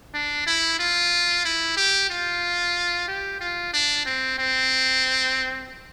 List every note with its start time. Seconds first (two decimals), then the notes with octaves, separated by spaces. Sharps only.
0.14 D4
0.47 E4
0.80 F4
1.45 E4
1.77 G4
2.10 F4
3.08 G4
3.41 F4
3.74 D4
4.06 C4
4.39 C4